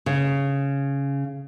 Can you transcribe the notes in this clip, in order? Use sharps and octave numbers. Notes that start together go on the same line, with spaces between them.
C#3